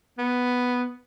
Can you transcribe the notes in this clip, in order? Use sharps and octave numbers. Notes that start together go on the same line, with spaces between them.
B3